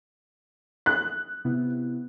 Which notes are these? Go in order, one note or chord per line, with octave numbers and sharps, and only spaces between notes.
F#6
C3 B3 E4